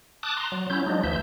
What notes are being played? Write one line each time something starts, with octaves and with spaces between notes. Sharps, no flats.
A5 D6 D#6 F#6
A#5 C6
F#3
F#3 C#4 E4 G6
F3 F#3 G#3 D4 D#4
D2 E3 F3 E5 G6